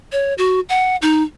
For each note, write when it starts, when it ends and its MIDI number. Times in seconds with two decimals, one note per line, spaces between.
0.12 0.34 73
0.38 0.60 66
0.69 0.96 78
1.02 1.23 63